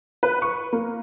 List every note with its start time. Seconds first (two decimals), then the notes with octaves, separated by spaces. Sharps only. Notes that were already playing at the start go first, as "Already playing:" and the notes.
0.23 B4
0.42 C#6
0.73 A#3